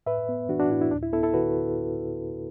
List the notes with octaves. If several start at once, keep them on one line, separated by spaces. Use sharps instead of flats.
A2 B4 E5
B3
E3 D4 F#4
D4 F#4
A2 E4
E4
D2 D4
E4
B3 E4 A4
E4 A4
D3 F#4 B4